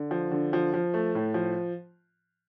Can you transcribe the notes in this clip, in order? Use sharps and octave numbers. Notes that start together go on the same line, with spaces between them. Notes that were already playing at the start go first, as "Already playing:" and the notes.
Already playing: D3
F3
D3
F3
F3
A3
A2
F3